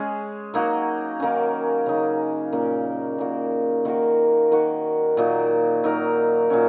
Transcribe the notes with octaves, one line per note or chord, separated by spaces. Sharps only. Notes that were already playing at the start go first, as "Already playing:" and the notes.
Already playing: G#3 C#4 G#4
F#3 A#3 D#4 F#4
D#3 A#3 C#4
C#3 F#3 D#4
A#2 A#3 C#4
A#2 A#3 F#4
D#3 A#3 F#4 A#4
D#3 A#3 F#4
A#2 F#3 A#3 D#4
F#3 D#4 A#4
A#2 F#3 C#4